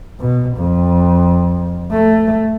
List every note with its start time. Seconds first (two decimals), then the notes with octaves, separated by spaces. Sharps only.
0.20 B2
0.57 F2
1.91 A3